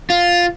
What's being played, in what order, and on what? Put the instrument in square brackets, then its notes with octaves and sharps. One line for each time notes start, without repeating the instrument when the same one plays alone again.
[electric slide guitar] F4